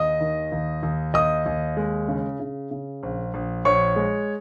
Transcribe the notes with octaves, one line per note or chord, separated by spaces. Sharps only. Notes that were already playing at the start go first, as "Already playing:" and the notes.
Already playing: D#2 D#5 D#6
D#3
D#2
D#2
D#2 D#5 D#6
D#2
G#3
C#3
C#3
C#3
A#1
A#1
A#1 C#5 C#6
G#3